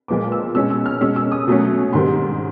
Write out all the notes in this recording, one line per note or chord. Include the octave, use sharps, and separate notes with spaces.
A#2 F3 G#3 B3 D6
E6
B2 G#3 C#4 E6
E6
F6
B2 G#3 C#4 E6
E6
D#6
B2 F#3 A3 C#4
G#2 D#3 G3 C4 C6